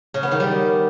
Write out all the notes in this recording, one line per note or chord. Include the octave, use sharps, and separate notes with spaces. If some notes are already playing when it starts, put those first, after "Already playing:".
C#3
B3
D#3
G3